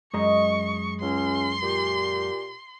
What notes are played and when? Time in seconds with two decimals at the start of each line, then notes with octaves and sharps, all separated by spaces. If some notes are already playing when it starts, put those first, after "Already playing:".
0.13 F#2 G#3 D#5 A#5 C#6
1.00 C#2 C#4 C6
1.62 A#2 G4